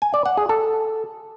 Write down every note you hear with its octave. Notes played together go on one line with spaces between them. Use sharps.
G#5
D5
F#5
G#4
A4